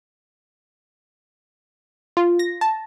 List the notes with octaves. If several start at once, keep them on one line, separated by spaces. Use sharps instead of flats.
F4
A#6
A5